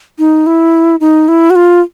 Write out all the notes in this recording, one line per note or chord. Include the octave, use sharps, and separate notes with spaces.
D#4
E4
D#4
E4
F#4
F4